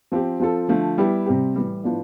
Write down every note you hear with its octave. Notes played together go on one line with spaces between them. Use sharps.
F3 C4 G4
F3 C4 F4 A4
D3 F3 A3
G3 B3 E4 G4
C3 G3 C4 G4
A2 E3 G3
A2 F3 B3 D4